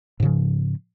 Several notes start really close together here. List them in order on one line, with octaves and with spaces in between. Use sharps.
G#2 C#3 F3